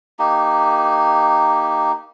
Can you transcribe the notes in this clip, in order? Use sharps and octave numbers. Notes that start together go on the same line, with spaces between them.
A#3 D#4 G4